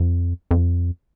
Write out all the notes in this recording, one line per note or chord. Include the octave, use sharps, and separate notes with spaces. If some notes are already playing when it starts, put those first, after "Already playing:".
Already playing: F2
F2